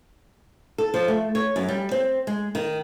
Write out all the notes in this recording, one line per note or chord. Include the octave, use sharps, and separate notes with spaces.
A4
F3
A3
C#5
F#2
G3
C4
G#3
D#3